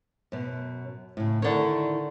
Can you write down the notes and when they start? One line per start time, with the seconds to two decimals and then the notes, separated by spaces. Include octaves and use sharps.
0.32 F#2 B2
1.17 A2 C#3
1.42 D3 D#3 E4 C#5